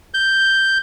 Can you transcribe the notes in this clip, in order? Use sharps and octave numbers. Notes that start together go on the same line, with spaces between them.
G6